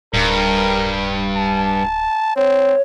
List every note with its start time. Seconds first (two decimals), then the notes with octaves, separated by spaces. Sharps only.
0.14 D1 G2 A#4
1.36 A5
2.36 C4 C#5